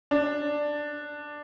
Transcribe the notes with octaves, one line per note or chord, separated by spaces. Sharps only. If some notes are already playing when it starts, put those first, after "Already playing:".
D4